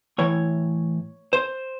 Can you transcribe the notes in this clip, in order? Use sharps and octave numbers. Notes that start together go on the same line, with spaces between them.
A2 E3 C#5
C5